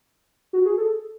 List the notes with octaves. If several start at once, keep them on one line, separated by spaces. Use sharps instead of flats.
F#4
G#4
A4